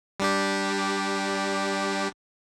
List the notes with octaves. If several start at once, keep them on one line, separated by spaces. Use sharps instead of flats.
G3 D4 G4